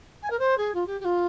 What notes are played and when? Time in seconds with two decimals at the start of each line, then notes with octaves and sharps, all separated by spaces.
0.22 G#5
0.30 A#4
0.39 C5
0.57 G#4
0.74 F4
0.86 G4
1.00 G4
1.04 F4